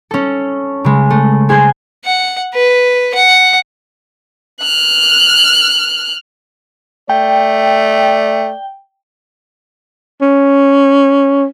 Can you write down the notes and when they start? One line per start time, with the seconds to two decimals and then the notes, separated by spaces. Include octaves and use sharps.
0.11 C#4 A4
0.84 C#3 G#3
1.10 A3
1.49 G#3 G#4 C5 G6 G#6
2.05 F#5
2.54 B4
3.14 F#5
4.61 F6 F#6
7.10 A3 D5 G5
10.21 C#4